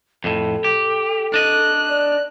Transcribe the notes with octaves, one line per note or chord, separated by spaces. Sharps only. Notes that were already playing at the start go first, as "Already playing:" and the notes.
F2 A2 A4
G4
D4 D#5 F#6
D5